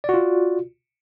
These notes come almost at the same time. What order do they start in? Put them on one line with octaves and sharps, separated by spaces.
D5 F#4 F4